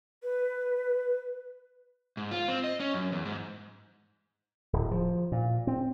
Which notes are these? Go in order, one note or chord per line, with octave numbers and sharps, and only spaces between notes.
B4
G#2
F4
C4
D#5
C#4
F#2
E2
G#2
D1
F3
A#2
C4